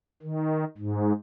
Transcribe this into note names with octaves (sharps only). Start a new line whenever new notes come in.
D#3
G#2